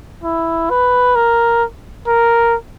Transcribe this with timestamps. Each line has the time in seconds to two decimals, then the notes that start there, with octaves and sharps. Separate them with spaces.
0.23 E4
0.70 B4
1.15 A#4
2.07 A#4